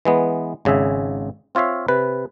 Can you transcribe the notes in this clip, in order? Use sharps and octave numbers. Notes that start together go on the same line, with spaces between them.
E3 G#3 B3
G#1 C#3 G#4 E5 G#5
C4 F4 C#5 E5 F5
C3 B4